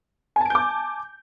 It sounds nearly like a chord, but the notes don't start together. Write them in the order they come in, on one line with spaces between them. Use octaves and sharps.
G#5 A5 D7 G6 D6